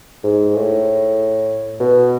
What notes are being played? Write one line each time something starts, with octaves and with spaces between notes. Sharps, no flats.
G#2
A2
B2